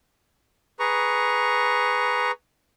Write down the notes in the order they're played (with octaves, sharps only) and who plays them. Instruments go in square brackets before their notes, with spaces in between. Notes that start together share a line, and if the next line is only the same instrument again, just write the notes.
[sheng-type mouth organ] G#4 B4 A#5 C#6